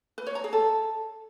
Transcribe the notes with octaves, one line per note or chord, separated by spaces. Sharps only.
B4
C#5
A#5
G#4
A4